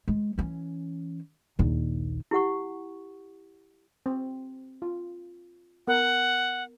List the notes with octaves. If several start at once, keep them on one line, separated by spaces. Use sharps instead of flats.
G#3
E3 C#4
A#1 D#2
E4 G4 F#5 C#6
C4
F4
B3 A#4 F#5